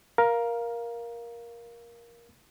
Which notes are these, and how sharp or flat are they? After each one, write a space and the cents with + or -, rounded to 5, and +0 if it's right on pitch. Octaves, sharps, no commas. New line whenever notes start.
A#4 +10 F5 +0